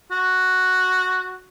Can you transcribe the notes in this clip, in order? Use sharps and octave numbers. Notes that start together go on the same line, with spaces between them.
F#4